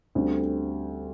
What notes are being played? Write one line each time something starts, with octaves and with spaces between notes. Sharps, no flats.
D2 D3 G3 C4